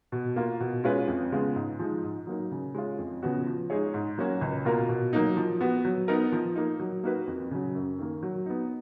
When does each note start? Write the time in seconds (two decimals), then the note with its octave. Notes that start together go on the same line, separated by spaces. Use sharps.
0.12 B2
0.36 A#3 F4
0.60 B2
0.84 G#3 C#4 F4 B4
1.08 F2
1.32 C#3 G#3 B3 F4
1.55 G#2
1.79 F3 G#3 D#4
2.03 G#2
2.27 F#3 A#3 D#4
2.51 C#3
2.75 G#3 C#4 F4
2.98 F2
3.23 C#3 F3 B3 F#4
3.46 F3
3.70 G#3 D#4 G#4 C#5
3.94 G#2
4.18 F#3 A#3 C#4 F#4
4.41 C#2
4.65 B2 A#3 F4 A#4
4.89 B2
5.13 F#3 A#3 D#4
5.37 F3
5.61 B3 F#4
5.85 F#3
6.08 B3 D#4 A#4
6.32 F3
6.56 A#3 D#4
6.80 F#3
7.04 A#3 D#4 F#4 B4
7.27 F2
7.51 C#3 F#3
7.75 F#2
7.99 D#3 A#3
8.23 F#3
8.46 B3 D#4